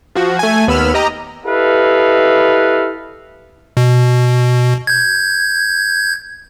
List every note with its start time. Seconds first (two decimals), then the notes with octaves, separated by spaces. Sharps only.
0.15 F3 F#4
0.39 A3 G#5
0.67 D#2 B3 B5 E6 F6
0.94 G4 D#5 A#5
1.46 E4 G4 A4 B4 D#5 F5
3.77 B2
4.87 G6 G#6